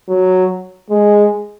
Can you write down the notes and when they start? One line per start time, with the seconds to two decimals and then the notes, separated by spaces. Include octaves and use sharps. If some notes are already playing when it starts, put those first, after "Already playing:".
0.08 F#3
0.90 G#3